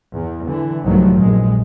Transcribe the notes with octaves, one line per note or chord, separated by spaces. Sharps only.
E2
D3 E3
C2 G#2 D#3 F3 F#3 A3
A#1 F#2 G#3